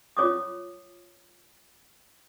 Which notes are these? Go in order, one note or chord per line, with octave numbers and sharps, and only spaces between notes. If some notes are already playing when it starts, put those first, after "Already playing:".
F4 C#5 D6 D#6